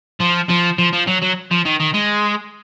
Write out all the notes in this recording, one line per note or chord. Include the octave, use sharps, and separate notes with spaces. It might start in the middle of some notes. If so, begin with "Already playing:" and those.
F3
F3
F3
F3
F#3
F#3
F3
D#3
D#3
G#3